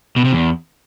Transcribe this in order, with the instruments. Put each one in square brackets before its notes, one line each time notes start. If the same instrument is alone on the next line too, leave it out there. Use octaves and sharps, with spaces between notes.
[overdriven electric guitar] B2
C3
E2